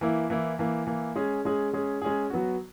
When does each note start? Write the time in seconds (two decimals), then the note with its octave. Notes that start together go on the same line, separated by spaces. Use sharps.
0.01 E3 A#3 E4
0.30 E3 A#3 E4
0.59 E3 A#3 E4
0.87 E3 A#3 E4
1.16 G#3 C#4 G#4
1.45 G#3 C#4 G#4
1.73 G#3 C#4 G#4
2.02 G#3 C#4 G#4
2.30 F#3 B3 F#4